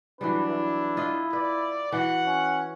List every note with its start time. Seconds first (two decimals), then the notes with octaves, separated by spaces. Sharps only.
0.21 E3 F#3 G3 D4 B4
0.50 E4
0.97 F4 D#5
1.33 B4 D5
1.92 E3 F#4 F#5
2.26 C#4